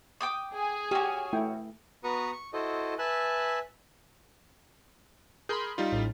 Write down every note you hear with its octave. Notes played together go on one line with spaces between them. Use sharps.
G5 D6 D#6
G#4 G#5
C#4 F#4 G4
A3 E4 G5
B3 F#4 B4 A#5 C#6 D#6
C#6
E4 F#4 A4 C5 D#5
B4 E5 G#5 A5 E6 F#6
G#4 A#4 B5 C6 G6
G3 D#4 F4
A1 A2